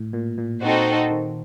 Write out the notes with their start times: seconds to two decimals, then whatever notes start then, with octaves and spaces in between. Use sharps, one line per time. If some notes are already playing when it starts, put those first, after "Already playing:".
Already playing: A2
0.13 A#2
0.38 A#2
0.62 C4 D#4 F#4 A4 C5
1.10 D#3